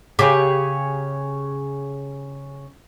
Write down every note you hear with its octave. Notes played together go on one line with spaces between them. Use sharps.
C#3 G4 G#4 C#5